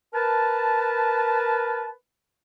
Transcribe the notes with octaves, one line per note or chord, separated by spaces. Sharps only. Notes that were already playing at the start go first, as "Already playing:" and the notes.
A#4 B4 A5